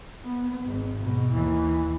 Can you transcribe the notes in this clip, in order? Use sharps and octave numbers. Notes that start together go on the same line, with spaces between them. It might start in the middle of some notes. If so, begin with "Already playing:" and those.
B3
G#1
G#2 B2
D#2 E3